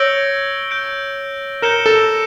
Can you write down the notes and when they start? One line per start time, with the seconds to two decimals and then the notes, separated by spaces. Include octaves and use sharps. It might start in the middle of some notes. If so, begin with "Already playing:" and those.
Already playing: C#5 E6 G6 A#6 D7 G7
0.70 G6 D7 G7
1.62 A#4 G6 C#7 E7 G7
1.86 A4